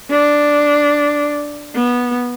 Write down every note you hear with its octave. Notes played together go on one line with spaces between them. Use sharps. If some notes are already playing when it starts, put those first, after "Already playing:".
D4
B3